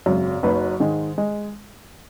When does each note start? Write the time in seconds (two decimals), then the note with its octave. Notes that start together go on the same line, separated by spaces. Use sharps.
0.06 G#1 F#2 C#3
0.43 F#1 F#2 F#3 D#4 B4
0.80 G#2 D#3 G#3
1.18 G#3